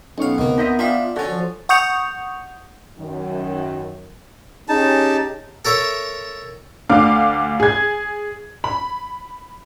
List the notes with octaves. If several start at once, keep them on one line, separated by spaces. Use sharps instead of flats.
B1 B3 C#4 D#4 F5 C#6
D2 C3 D#3 A#3 C4
D#4 D#5 E5 A#5 C6 D#6
D4 F4 E5 F5 G5 A#5
D3 C#4 F#4 A5 A6
F3
F#5 C#6 D#6 G6 C#7 F7
F#2 D#3
C#4 D#4 G4 G#4 A5
A4 A#4 C#5 E5
D2 D3 F5 D6
G#4 G#6
B5